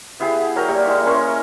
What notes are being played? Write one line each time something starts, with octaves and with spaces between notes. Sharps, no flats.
B3 E4 G4 G#4
F#3 A#4 G5 A#5
G3 A#3 G4 C#6
G#3 E4 D5 C#6
C#4 A#4 C5 C#5